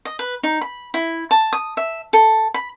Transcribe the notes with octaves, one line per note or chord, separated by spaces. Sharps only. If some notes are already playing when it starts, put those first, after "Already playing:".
D#5
B4
D#4
B5
E4
A5
D#6
E5
A4
B5